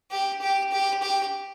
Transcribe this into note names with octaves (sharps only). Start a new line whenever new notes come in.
G4
G4
G4
G4